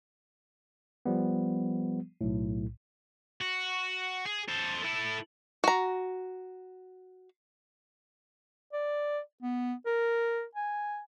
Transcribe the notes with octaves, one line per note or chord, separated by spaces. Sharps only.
F3 G3 B3
B1 A2
F#4
G#4
A4 C5
E4 A4
F#4 A#5
D5
B3
A#4
G#5